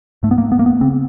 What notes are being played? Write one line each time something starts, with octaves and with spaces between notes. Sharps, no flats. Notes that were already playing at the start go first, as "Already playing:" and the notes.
G#2 A3
B3
A#3
B3
A#3
B3
C#3 C4